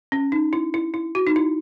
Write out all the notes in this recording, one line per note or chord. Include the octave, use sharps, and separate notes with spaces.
C#4
D#4
E4
E4
E4
F#4
D#4
E4